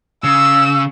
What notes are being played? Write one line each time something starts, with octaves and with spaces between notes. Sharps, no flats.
C#3 E6